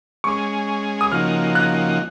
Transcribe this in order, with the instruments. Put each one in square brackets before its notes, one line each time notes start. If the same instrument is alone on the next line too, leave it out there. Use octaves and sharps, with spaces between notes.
[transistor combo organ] G#3 C#4 G#4 [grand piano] C#6
[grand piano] D#6
[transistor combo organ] C#3 F3 A#3 D#4 F#4 [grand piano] F6
[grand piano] F#6